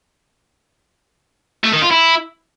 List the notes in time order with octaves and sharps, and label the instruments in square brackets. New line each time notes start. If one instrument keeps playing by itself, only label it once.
[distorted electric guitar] A3
D#3
F4
E4